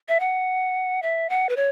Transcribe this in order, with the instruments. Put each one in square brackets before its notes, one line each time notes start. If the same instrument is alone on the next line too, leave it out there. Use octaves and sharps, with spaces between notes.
[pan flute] E5
F#5
E5
F#5
B4
C#5